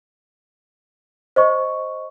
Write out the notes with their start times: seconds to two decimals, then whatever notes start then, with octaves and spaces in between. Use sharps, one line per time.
1.36 C5 D#5 C#6